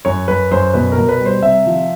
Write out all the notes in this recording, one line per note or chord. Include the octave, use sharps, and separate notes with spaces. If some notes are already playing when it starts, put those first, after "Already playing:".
F#2 C#5
F#2 B4
F#2 C5
B2 B4
A#4
B2
B4
G3
C5
C3 E5
F3